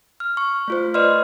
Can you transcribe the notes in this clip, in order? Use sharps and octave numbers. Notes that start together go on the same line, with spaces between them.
F6
C#6
A3 F4 C5
B4 D5 D#5 C6 F6